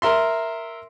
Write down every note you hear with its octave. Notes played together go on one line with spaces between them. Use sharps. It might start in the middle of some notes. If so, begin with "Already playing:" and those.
A#4 E5 C6